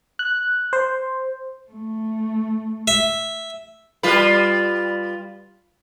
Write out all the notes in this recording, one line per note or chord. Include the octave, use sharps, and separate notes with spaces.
F#6
C5
A3
E5
G3 F4 B4